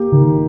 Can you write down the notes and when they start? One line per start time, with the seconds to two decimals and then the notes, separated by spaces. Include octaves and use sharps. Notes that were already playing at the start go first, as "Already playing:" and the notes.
Already playing: A#3 G4
0.12 D#3